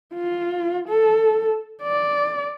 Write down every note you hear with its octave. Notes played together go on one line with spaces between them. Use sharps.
F4
A4
D5